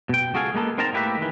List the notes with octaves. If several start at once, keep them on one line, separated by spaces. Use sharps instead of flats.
B2 G5
C#2 F#4 G#4 A4 F5 G#5
G#3 A#3 B3 A4
C4 D#4 A#4 C5 A5 A#5
A2 A#3 E4 G4 B4 E5
D#3 E3